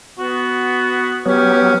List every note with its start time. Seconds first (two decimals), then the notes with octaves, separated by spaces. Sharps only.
0.19 B3 F#4
1.26 F#3 B3 C#4 G4